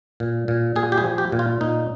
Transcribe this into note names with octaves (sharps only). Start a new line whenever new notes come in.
A#2
A#2
A#2 G#4
G4
G#4
F3
G4
A#2
F4
A#2 D#4